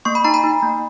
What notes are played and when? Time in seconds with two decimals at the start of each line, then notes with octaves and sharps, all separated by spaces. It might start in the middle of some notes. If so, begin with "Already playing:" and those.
0.05 A#3 C#6
0.15 B5
0.24 D#4 A#5
0.34 B5
0.44 D#4
0.62 A#3